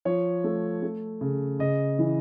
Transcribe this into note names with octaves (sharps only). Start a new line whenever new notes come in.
F3 C#5
A3
A3
C#3
C#3 D#5
E3